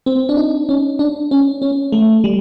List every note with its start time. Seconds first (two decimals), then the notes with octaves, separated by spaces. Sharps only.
0.06 C4
0.29 D4
0.37 D#4
0.69 C#4
0.99 D4
1.31 C#4
1.62 C#4
1.92 A3
2.24 G3